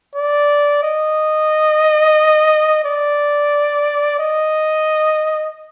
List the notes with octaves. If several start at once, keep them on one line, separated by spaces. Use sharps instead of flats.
D5
D#5
D5
D#5